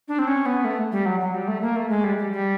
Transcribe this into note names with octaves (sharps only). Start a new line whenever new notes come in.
D4
C4
C#4
B3
A3
G3
F#3
F#3
G3
A3
A#3
A3
G#3
G3
G3
G3